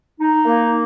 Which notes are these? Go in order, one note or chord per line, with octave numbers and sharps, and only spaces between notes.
D#4
A#3